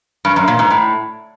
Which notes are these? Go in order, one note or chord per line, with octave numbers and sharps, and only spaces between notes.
G2
F#2
A#2
G#2
A2